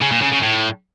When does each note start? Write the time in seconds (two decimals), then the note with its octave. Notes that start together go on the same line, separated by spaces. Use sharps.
0.02 C#3
0.12 A#2
0.22 C#3
0.33 C#3
0.43 A2